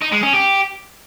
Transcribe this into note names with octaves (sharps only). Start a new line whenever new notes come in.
D#4
G#3
C#4
G4